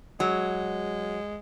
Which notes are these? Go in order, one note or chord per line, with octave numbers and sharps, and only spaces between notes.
F#3 G#3